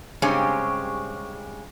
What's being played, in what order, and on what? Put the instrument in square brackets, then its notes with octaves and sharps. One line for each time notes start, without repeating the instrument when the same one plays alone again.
[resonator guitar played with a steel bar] G2 C#3 G#3 C4 C#4 G4